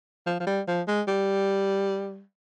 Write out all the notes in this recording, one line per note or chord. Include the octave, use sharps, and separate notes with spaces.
F3
F3
G3
F3
G#3
G3